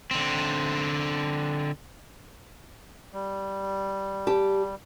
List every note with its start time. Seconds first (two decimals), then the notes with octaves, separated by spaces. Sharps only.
0.11 D3 C4
3.13 G3
4.27 G4 A5